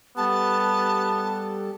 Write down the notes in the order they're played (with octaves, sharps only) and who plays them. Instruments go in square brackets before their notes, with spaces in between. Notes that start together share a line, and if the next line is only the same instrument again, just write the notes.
[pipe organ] G3 G4 A4 [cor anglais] B3 [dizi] A5